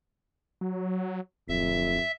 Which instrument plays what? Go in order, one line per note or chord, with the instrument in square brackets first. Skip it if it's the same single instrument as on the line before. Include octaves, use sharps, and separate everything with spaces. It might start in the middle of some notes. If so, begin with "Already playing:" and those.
[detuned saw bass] F#3
[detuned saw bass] D1 [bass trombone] F2 [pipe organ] E5